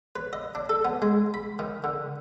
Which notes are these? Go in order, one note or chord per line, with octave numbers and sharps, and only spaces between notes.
B4
D#5
D4
A4
B3
G#3
B5
D#3
D3